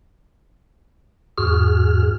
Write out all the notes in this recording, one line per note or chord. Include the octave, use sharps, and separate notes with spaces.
E2 G#2 F#4 G#4 F6